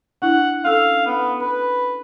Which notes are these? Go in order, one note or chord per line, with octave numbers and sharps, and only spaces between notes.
D4 E4 F#5
C#4 A4 F5 E6
B3
B4 B5